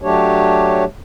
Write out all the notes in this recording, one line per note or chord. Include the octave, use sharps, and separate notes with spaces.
F#3 A3 D4 G4 C#5